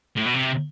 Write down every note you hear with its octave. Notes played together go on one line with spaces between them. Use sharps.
A2
B2
C3